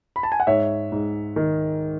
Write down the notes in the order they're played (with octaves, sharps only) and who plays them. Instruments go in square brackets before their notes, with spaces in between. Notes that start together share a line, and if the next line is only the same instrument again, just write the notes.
[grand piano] B5
A5
G#5
F#5
G#2 C#5 E5
G#2
D#3